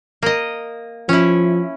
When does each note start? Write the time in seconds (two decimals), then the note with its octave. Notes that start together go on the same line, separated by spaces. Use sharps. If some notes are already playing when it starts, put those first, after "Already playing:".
0.23 A#3 D#5
1.09 F3 C#4 E4